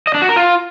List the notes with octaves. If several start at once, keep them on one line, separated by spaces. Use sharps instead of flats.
D#5
D4
F#4
A#4
F4